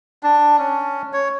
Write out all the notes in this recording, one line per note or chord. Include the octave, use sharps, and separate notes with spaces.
D4
C#4
C#5